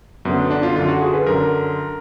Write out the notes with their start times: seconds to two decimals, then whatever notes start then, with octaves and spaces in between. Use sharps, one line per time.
0.25 F#2 B3
0.29 D3
0.38 B3
0.51 D4
0.63 F4
0.76 F#2 D3 F4
0.88 F#4
1.01 G#4
1.14 B4
1.26 F#2 D3 A#4